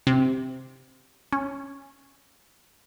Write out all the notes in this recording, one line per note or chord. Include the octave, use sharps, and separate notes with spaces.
C3
C#4